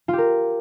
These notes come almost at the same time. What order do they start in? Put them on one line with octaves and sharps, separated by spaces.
F4 G4 A#4